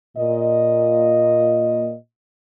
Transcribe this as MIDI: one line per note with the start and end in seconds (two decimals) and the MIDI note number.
0.17 1.94 46
0.17 1.94 75